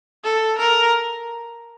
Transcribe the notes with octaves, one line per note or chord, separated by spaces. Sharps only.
A4
A#4